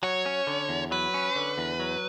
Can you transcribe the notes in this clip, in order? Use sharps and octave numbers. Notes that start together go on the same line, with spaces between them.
F#3 C#5
C#4
D3
E2
F#3 B4
C#4
D3
E2
F#3